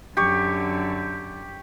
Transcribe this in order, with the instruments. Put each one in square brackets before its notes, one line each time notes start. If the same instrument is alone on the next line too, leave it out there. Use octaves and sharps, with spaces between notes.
[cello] F#2 D3 [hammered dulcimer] G4 C#6